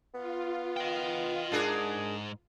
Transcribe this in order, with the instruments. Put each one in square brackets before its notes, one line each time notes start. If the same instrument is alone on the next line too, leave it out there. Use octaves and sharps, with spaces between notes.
[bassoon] B3 [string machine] F4
[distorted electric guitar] D#5 G5
[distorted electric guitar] G#2 [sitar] D4 G#4 A#4